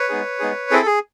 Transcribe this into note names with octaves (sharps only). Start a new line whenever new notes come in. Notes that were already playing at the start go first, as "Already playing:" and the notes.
Already playing: B4 C#5
G#3 B3 D#4 G#4
G#3 B3 D#4 G#4
C4 E4 G#4 A4
G#4